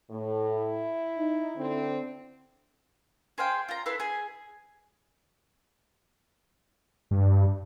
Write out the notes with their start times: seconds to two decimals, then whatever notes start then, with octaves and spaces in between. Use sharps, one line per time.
0.10 A2
0.50 E4
1.17 D#4
1.56 D3 C4
3.38 G#4 C5 F5 G5
3.69 F4 A#5
3.86 E4 A4 B4 C6
4.00 G#4 G#5
7.11 G2